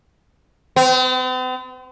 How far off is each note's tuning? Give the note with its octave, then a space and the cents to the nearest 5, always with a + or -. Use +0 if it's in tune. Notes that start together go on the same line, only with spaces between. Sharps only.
C4 -45